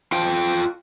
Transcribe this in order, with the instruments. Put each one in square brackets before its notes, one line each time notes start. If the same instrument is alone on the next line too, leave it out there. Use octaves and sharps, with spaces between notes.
[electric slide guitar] F4 F5 G5